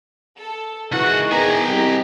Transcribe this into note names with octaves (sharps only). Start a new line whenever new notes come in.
A4
C#2 E3 D#4 F#4 G#4 A#4 F#5
E2 G4 G#5 A#5
C2